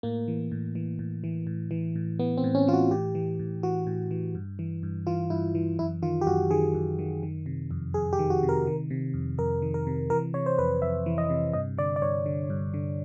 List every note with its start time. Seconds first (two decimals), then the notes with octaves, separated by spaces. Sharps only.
0.03 A2 A#3
0.28 E3
0.52 A2
0.75 E3
0.99 A2
1.24 E3
1.47 A2
1.71 E3
1.96 A2
2.19 E3 B3
2.38 C4
2.44 A2
2.55 C#4
2.68 E3 F4
2.73 F#4
2.91 A2 G4
3.15 E3
3.39 A2
3.63 E3 F#4
3.87 A2
4.11 E3
4.35 G2
4.59 E3
4.83 G2
5.07 E3 F4
5.30 G2 E4
5.55 E3
5.79 F#2 E4
6.03 D#3 F4
6.21 G4
6.27 F#2 F#4
6.51 D#3 G#4
6.74 F#2
6.99 D#3
7.23 D#3
7.46 C3
7.71 F2
7.94 F2 G#4
8.13 G4
8.19 D#3
8.30 F#4
8.43 C3
8.49 A#4
8.67 D#3
8.90 C3
9.14 F2
9.38 F2 A#4
9.62 D#3
9.74 A#4
9.87 C3
10.10 E3 A#4
10.34 C3 C#5
10.46 C5
10.58 F2 B4
10.82 F2 E5
11.06 E3
11.18 D#5
11.30 C3
11.53 G2 D#5
11.78 D3 D5
11.96 D5
12.02 G2 C#5
12.26 D3
12.50 G2
12.74 D3